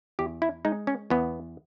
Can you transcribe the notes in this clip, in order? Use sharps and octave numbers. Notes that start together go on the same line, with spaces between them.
E2 G4
E4
G#3 D#4
C#4
E2 B3